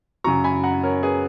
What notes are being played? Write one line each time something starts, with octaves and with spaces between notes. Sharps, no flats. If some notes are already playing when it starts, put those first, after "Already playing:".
F#2 C#3 F#3 A#5 C#6
G#5 B5
F#5 A#5
A#4 C#5
G#4 B4